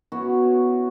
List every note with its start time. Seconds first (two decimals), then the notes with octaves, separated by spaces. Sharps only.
0.12 B3 C#4 E4 F#4